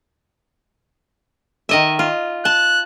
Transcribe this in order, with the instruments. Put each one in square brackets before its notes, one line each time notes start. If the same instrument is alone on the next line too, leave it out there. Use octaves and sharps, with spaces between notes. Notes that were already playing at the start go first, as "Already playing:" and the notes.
[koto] D#3 D#5 E5
F4
[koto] A5 [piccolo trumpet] F#6